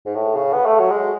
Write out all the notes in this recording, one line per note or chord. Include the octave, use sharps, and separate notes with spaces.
G#2
A2
C#3
B3
A3
F#3
G#3